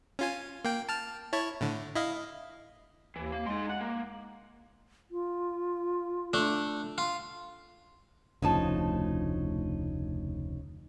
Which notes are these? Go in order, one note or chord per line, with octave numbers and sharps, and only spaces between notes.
C#4 F4 G#5
A#3 G5
A5 F6
E4 C#5 A5
A2 D3
E4 D#5 F5
D#2 E3
A#3 F5
G#3 D#4 C6
F#5
A#3
F4
A3 D4
F4
F1 D2 C#3 F3 D#4 A5